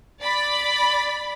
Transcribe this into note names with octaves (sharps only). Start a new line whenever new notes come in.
D5 B5